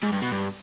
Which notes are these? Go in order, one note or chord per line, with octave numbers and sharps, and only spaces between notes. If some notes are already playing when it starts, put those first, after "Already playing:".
G#2
G2
B2
G2